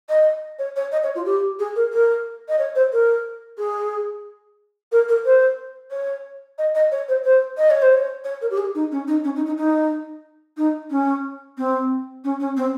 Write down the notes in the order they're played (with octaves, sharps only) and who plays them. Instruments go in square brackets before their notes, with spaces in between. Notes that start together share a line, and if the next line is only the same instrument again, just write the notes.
[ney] D#5
C#5
C#5
D#5
C#5
F4
G4
G#4
A#4
A#4
D#5
C#5
C5
A#4
G#4
A#4
A#4
C5
C#5
D#5
D#5
C#5
C5
C5
D#5
C#5
C5
C#5
C#5
A#4
G4
G#4
D#4
C#4
D#4
C#4
D#4
D#4
D#4
D#4
C#4
C4
C#4
C#4
C4